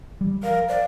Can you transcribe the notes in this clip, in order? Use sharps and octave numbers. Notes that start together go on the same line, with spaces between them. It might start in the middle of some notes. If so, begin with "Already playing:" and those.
G3
F3 A#4 F5
C5 D5 F5